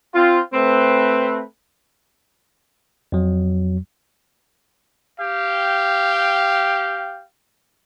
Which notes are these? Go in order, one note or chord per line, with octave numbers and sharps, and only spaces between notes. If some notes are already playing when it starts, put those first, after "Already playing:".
C4 F4
A3 C4 B4
F2 F#3
G4 F5 G5